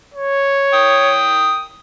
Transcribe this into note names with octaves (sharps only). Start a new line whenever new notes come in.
C#5
G5 D#6